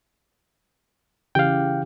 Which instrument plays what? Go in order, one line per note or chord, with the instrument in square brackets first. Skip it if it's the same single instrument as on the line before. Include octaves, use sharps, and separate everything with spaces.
[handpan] C#3 E3 G4 [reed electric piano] F5 G5